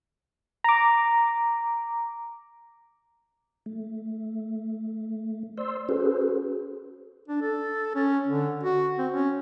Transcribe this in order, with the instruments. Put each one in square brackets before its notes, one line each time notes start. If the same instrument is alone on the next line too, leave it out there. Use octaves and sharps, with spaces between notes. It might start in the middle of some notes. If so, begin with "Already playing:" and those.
[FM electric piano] A#5 D6
[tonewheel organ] A3
C5 D5 C6 E6
C#4 F#4 G#4 A4 B4 C5
[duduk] D4
A4
C#4
D3
F#4
C4
C#4